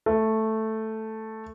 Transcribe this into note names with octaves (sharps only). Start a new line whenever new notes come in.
A3